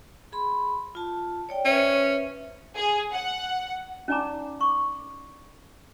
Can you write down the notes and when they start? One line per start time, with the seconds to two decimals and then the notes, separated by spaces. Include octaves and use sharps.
0.32 G#4 B5 C6
0.95 F4 A5
1.49 C#5 D5 G5
1.65 C#4 B4 C5 E5
2.75 G#4
3.13 F#5
4.08 C#4 D#4 D5 G#5 A#5 D6
4.61 C#6 D6